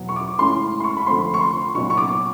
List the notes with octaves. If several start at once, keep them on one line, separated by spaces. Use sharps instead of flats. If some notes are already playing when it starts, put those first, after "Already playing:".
Already playing: E2 B2 F#3
C#6
D6
G#2 E3 A3 C#4 C6
C6
C#6
B5
F2 D3 F3 A3 C4 C6
C#6
C6
A#2 F#3 B3 D#4 C#6
C#6
D6